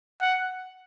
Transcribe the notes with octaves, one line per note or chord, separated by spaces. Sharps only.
F#5